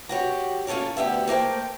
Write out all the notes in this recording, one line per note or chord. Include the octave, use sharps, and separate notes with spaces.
F#4 G4 C#5
A#3 C#4 F4 A4 C#5
D2 B3 G4 E5
A3 A#3 C5 G5